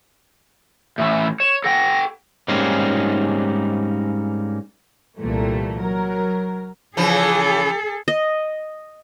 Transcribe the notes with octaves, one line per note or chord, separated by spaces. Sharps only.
A2 E3 C#4 E5
C#5 E7
A4 F#5 G5 A#6
G#2 G3 A#3 C4 C#4 D#4
C2 A#2 E3 G3 A3
F#3 A#4
C#3 E3 F3 G#4 A4
D#5